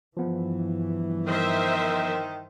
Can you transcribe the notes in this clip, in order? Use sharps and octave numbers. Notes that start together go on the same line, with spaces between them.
G2 E3 F3 B3
D#3 A#4 C5 E5